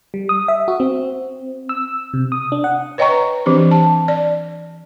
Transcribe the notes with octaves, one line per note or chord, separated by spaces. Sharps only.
G3
D#6
E5
F#4
C4
E6
C3
D#6
D4
F#5
B4 C#5 D#5 G5 A#5 C#6
E3 C4 D4 G4 C5
A5
D5